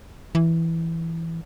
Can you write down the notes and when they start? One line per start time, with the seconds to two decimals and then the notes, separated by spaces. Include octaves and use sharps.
0.35 E3